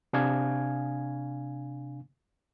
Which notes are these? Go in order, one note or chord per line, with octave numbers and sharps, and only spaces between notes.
C3 D4 F5 G#5 G#6